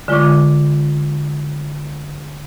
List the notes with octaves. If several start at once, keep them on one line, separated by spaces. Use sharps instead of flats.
D3 G#3 F4 D5 C#6 D6